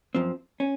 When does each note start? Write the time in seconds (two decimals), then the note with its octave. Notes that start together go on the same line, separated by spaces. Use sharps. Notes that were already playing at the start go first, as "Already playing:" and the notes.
0.15 F#2 F3 C4
0.60 C#4